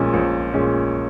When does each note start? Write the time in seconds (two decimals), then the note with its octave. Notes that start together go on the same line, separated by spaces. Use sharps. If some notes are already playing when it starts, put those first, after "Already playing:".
Already playing: A#1 A#2 G#3 C#4
0.14 A#1
0.53 A#2 G#3 C#4